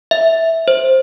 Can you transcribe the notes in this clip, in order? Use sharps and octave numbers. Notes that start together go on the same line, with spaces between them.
E5
C5